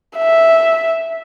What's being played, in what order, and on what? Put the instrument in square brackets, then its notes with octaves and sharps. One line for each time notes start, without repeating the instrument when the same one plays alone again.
[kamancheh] E5